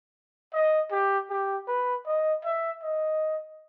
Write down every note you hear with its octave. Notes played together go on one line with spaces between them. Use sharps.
D#5
G4
G4
B4
D#5
E5
D#5